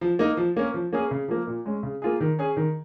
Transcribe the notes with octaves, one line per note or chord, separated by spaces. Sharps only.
F3
A#3 D#4
F3
A#3 C#4
F3
A#3 C#4 G#4
C#3
F3 A#3
A#2
G#3 C#4
C#3
A#3 F4 G#4
D#3
C#4 G#4
D#3